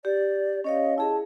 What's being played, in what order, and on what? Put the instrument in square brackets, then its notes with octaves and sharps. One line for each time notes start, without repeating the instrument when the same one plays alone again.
[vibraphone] G4 [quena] D5
[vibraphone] C#4 C#5 F5 [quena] D#5
[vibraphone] E4 G#4 [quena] A5